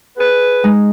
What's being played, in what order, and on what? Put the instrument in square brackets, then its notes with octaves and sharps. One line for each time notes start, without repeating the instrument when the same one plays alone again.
[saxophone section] G#4 B4
[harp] G#3 D#4